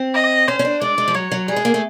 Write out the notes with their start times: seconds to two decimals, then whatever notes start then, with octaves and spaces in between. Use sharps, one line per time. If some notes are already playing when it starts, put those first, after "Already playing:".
Already playing: C4
0.14 D#5
0.48 C#4 C5
0.59 C#4
0.65 D4
0.81 G#3 D5
0.98 G#3
1.08 F3
1.14 F#3 C#5
1.32 F#3
1.48 G3 G#4
1.56 G#3
1.65 A#3
1.74 A3